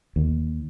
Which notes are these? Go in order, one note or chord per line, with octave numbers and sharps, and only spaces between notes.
D#2